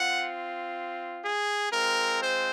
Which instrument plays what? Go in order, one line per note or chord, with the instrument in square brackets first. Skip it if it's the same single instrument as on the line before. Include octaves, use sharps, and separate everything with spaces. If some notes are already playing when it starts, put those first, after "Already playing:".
Already playing: [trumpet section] C4 F4 F#5
G#4
G#3 C4 F4 A#4
C5